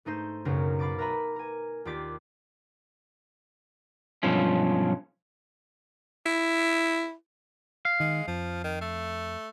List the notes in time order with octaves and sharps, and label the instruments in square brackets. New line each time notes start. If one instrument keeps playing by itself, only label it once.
[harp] G#2 A3 D#4 C5
B1 F#2 C#3 C#4 A#4
F5 B5 D6 A6 D7
A#4 B4 E5 G#5 A#5 B5
A#4 G#5
D#2 F4 G4 D5 D6 B6
[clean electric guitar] B1 G2 F3 C#4
[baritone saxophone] E4
[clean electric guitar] F5
[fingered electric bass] D#3 [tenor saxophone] G#3
[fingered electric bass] F2 [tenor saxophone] F3
[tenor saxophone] D#3
A3